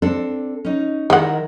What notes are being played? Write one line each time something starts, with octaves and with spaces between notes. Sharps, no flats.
C4 D4 A4
C#4 D#4
D#3 G#3 E4 A#4 F#5